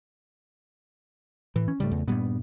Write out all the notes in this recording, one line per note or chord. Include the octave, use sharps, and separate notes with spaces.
A2 E3
C#4
G#2 C#3 G3 A3
E2
G2 A#2 G3 B3